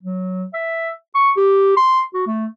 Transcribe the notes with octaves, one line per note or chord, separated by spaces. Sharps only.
F#3
E5
C#6
G4
C6
F#4
A3